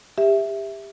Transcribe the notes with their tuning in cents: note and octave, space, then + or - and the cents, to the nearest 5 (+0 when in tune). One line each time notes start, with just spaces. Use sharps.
G4 +30 E5 +0